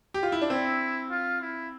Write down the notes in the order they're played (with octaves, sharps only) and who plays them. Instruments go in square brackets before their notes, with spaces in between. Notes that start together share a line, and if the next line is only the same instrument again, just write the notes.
[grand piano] G4
F4
E4
D4
[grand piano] C4 [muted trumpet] E4
[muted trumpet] F4
E4